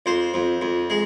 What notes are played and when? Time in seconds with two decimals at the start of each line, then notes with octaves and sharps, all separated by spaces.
0.06 F2 C5
0.34 F2
0.62 F2
0.90 G#3